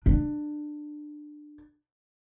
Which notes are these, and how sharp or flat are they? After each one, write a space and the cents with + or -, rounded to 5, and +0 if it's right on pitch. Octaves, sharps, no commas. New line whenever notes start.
D4 +20